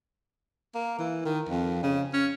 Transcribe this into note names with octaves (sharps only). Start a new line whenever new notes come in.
A#3
E3
D#3
F2
C#3
C#4